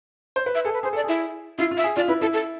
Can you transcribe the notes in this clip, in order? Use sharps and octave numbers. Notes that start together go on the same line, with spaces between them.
C5
B4
E5
G#4 A4
B4
G#4 C5
A4 D5
E4 G#4
E4 F4
F4
E5
G#4
F4 D5
E4 B4
E4 A4
A4